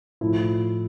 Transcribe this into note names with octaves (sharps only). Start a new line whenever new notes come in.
A2 F3 E4